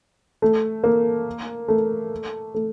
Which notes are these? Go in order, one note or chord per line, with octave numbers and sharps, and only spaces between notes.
A3
A#3
A3
A3